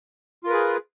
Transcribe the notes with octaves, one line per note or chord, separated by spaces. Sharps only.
F4 G#4 A#4 B4